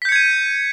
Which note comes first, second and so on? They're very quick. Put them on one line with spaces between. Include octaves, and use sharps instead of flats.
B6 G6 C#7 G#6 D#7